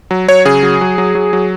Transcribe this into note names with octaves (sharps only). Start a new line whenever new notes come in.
F#3
F#3 C#5
C#3 G#4
F#3
F#3
F#3
F#3
F#3